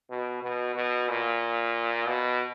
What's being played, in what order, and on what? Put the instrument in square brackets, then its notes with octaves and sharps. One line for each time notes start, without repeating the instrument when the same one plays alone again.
[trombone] B2
B2
B2
A#2
B2